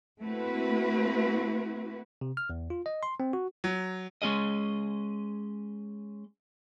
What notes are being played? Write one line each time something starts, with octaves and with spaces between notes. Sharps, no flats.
A3 A#3 C4 E4 F#4 B4
C3
F6
E2
F4
D#5
C6
C4
F#4
F#3
G#3 C#4 G#4 D#5